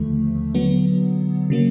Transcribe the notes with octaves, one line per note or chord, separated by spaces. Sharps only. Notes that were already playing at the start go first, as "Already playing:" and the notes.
Already playing: D#2 D3 F3 A3
D3 F#3 B3
C#3 F#3 A#3